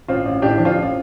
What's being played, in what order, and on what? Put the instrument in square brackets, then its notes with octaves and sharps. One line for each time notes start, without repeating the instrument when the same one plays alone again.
[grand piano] A1 C4 F4
A1
A2 D4 G4
F3 D4
C4 F4
A1